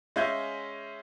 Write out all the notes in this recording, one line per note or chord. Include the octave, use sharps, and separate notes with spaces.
G#3 C#4 E5 F5 G6 G#6